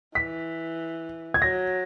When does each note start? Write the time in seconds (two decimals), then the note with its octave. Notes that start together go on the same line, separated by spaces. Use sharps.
0.15 E3 B6
1.34 G#6
1.41 F#3 A#6